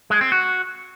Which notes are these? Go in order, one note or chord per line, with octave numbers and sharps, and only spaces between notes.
G#3
C4
F#4